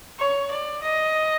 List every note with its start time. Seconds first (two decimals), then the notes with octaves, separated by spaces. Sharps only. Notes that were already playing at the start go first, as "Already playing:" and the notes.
0.19 C#5
0.51 D5
0.82 D#5